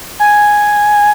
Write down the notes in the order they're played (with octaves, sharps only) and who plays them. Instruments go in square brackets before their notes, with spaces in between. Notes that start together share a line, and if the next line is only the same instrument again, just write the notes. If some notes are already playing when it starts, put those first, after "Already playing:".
[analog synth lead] G#5